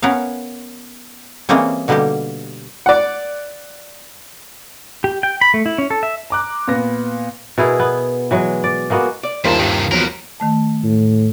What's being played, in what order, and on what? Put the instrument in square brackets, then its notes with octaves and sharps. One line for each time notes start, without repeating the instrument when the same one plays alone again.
[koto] B3 C#4 A#4 F5
E3 G3 G#3 A#3 C4 C#4
B2 D3 G3 A#3 D#4 G4
[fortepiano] D5 F#5
[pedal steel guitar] G4
G5
B5
A3
E4
C#4
A4
E5
[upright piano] A#5 D6 F#6
A#2 B3 A#6
[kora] B2 E4 G#4 A#4
B3
E3 F#3 G#3
D5
G#3 A#3 B3 F#4
[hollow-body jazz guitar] D5
[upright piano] G1 D#2 F5 [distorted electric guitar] G3 A5 [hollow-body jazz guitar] G#4 A#4 C5
[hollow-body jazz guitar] G2 [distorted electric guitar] C3 D#3
[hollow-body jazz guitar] E2 F3 F#3 [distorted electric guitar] B3 A#4
[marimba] D#3 A3 A5
[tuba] A2